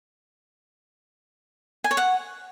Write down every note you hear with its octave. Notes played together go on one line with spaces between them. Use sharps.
G#5
C#5
F#5